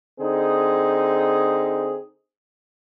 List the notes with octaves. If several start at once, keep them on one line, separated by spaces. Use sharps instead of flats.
D3 C4 D#4 G#4